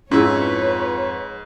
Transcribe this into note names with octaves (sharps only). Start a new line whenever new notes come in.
F2 G#2 C#4 E4 G#4 B4 C#5